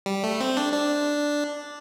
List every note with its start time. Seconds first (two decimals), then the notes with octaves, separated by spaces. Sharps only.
0.06 G3
0.24 A3
0.40 C4
0.57 D4
0.73 D4